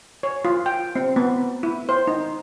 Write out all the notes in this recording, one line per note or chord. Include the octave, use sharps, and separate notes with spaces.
C#5
F4
G5
C4
B3
E4
C5
D#4